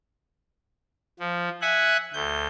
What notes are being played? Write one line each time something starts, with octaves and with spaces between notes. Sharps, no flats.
F3
E5 F#5 G#5 F#6
D2 G6